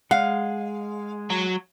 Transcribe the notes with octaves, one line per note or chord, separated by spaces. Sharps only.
G#3 F5 F#5
F#3